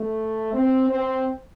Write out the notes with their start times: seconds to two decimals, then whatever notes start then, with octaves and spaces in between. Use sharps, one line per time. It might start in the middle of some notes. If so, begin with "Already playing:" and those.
Already playing: A3
0.54 C4
0.89 C4